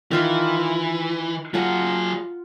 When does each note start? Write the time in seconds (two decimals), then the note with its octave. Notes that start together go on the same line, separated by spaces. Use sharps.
0.11 D#3 E3 F4 C6
1.54 F#3 F4 G#4 F#5 A#5